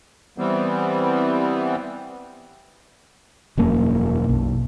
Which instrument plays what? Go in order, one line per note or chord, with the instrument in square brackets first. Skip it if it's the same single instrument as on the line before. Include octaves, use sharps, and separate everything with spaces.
[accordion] E3 G3 B3 C4
[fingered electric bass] E1 F#2 A#3
B1